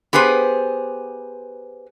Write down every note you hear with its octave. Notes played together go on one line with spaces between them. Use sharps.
B3 G4 G#4 B4 C5